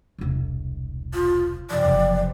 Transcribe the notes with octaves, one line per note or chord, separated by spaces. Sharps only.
E1 C2
F4
F#2 C3 F3 D5
F#1 F#2 C3 B3